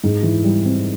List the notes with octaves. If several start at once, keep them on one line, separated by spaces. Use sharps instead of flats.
G#2
E3
G3
C4